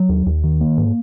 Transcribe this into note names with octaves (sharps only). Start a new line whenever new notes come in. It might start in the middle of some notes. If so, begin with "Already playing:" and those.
Already playing: F#3
D#2
D#2
D#3
A#3
G#2